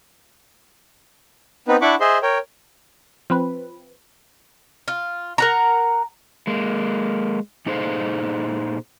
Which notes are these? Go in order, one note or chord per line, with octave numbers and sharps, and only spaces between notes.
B3 C4 D#4 B4
D4 E4 F#5 B5 C#6 D6
G#4 C5 D#5 E5 C6
A#4 C#5 G5
F3 C4 B4
F4
A#4 F#5 A#5
G#3 A#3
A#2 D#4 G#4 A4 C5 F5